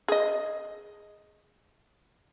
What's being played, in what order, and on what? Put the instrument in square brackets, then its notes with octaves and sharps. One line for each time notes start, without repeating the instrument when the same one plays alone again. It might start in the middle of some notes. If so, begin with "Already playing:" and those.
[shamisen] G#4 D#5